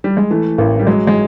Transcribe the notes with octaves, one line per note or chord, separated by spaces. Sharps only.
G3
G#3
E3 A3
A1 A#3
G3
F#3 G#3
G#3